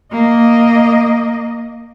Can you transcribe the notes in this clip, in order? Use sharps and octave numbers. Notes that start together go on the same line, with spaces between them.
A#3 D#5